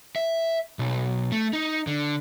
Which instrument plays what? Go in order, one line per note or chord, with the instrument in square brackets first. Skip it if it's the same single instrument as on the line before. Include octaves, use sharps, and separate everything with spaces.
[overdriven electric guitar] E5
B1
A3
D#4
D3